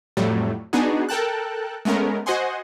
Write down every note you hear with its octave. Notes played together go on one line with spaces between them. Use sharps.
F2 A2 F#3 G3 A3
B3 D4 D#4 F#4 G#4
A4 A#4 G5 A5 F#6
G#3 A3 B3 C#4 A#4
F#4 C5 D#5 F#5 G#5 C6